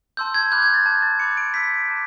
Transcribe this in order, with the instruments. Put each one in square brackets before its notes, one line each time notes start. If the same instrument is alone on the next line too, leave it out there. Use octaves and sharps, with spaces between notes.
[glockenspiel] A5 C6 E6 G6
G#6
B5 D6 F#6 G6
G#6
A6
A5 D6 G6 G#6
A6
B5 D6 F#6 C#7
D7
B5 E6 G6 B6
A5 D6 F#6